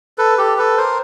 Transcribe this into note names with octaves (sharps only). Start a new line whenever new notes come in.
A4 B4
G4 A4
A4 B4
A#4 C5